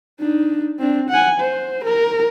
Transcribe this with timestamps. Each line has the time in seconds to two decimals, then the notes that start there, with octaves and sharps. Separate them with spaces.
0.20 D4 D#4
0.79 C4 D4
1.09 F#5 G#5
1.40 C5
1.84 A#4